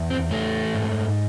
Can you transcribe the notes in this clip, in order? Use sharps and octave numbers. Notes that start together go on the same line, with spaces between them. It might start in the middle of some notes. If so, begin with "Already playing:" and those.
Already playing: E2
C4
E3 A3
G#2